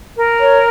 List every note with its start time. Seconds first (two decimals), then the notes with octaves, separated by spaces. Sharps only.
0.17 A#4
0.40 C#5